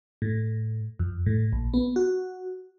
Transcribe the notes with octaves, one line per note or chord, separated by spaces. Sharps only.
A2
F2
A2
A#1
B3
F#4